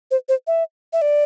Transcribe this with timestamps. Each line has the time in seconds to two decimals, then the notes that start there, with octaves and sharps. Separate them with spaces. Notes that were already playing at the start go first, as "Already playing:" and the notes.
0.11 C5
0.29 C5
0.47 E5
0.93 E5
1.02 D5